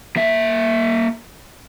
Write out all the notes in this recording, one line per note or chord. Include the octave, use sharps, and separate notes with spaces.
A#3 E5